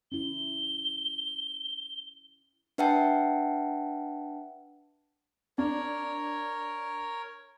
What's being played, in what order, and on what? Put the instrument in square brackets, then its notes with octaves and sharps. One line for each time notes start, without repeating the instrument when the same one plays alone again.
[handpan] C#4 E4 [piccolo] G7
[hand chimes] D4 B4 E5 F#5 G5 A5
[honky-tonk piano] D4 [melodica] A#4 C#5